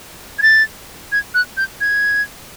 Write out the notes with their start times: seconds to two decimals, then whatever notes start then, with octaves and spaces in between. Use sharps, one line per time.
0.39 G#6
0.42 A6
1.12 G#6
1.34 F#6
1.57 G6
1.81 G#6